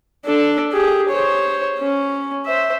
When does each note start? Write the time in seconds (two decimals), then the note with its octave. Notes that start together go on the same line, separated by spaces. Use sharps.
0.25 D4 A4
0.72 G4 G#4
1.09 C5 C#5
1.79 C#4
2.46 C5 E5